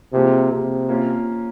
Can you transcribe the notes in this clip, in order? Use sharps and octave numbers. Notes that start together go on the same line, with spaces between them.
C3 F3 A#3 F4 G#4
C3
A#3 C#4 F4